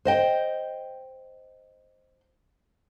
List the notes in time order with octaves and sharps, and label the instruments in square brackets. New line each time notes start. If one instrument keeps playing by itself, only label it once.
[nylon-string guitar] C5 D#5 G5